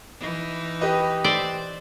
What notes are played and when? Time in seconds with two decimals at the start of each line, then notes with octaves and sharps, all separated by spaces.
0.20 E3 D#4
0.81 G4 B4 D#5
1.24 C5 D5 E5